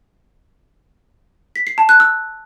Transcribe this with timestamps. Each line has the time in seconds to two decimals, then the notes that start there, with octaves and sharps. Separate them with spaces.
1.56 B6
1.67 C7
1.78 A5
1.89 F#6
2.00 E6